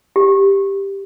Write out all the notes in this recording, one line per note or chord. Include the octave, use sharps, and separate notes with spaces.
G4